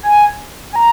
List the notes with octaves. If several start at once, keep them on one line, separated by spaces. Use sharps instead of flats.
G#5
G#5
A#5